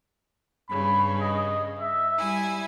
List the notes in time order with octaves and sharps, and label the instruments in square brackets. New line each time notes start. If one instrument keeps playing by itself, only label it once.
[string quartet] G2 C#3 [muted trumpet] B5
[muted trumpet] D#5
E5
[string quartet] G3 E4 G#5